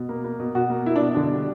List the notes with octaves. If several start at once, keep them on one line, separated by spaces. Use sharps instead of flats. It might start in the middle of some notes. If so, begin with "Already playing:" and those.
Already playing: B2
A#3
A#3
B2
B2 F#4
A#3
A#3 E4
D4
B2
D3 D4
G3